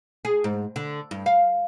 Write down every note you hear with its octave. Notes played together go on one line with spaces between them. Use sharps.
G#4
G#2
D3
G2
F5